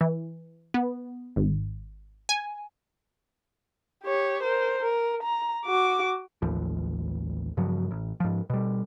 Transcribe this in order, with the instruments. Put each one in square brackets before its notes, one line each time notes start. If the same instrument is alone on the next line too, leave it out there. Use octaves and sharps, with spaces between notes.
[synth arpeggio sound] E3
B3
G#1
G#5
[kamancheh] G4 C#5
A#4 C5
A#4
A#5
F#4 D6
[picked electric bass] A1 D#2 F3
G2 C#3 F3 F#3
A1
G#2 F3
B2 G3